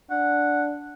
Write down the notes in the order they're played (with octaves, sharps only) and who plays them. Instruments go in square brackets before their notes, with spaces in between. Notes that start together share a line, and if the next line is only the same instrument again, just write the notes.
[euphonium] D4 [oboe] F#5